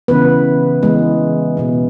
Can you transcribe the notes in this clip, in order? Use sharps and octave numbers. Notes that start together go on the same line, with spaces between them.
C#3 E3 B3 B4
E3 G#3 B3
B2 B3